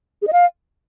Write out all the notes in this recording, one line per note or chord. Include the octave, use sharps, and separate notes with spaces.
G#4
D#5
F5